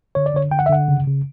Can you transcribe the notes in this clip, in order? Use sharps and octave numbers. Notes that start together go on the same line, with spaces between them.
D3 C#5
D5
D3 C#5
D3 G5
F#5
E5
D3 F#5
C#3
C#3